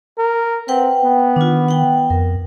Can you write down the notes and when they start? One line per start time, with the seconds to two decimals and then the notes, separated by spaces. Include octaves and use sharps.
0.18 A#4
0.68 C4 B4 F#5 G5
1.04 B3
1.36 D#3 D4 F4
1.68 F#5 G5
2.10 F2 A#4